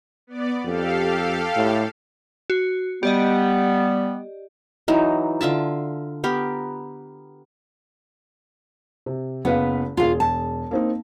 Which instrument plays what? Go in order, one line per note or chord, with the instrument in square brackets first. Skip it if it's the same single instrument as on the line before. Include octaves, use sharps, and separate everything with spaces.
[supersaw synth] B3 D5
[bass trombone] F2 [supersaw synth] G4 A4 F5
[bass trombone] A2
[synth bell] F#4
[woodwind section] G3 B3 [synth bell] G4 D5 D#5
[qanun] E3 F#3 D#4
D3 F4 E5 A5
B3 G4 A#4
[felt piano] C3
[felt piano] F#1 B4 F5 [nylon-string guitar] B3
[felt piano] E1 G#4 [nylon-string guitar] F4 F5
[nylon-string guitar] A5
[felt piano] A#3 C4 D#4